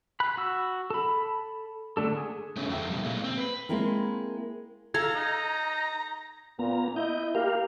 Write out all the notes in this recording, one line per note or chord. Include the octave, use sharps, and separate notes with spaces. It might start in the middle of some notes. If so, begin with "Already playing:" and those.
B5 F#6
F#4 E6
A4 B5
D3 A3 D4 A4
G#4
A3 B3 C#4 G#4
F2 F3 A4 E5 G5
B2 G3
A#2 G#3 A#3
C4
B4
G#3 A#3 C4 E4 A#4
A4 F5 A#5 G#6
D#4
A#2 B3 A#5
E4 D#5 G6
A#3 G4 A#4 F5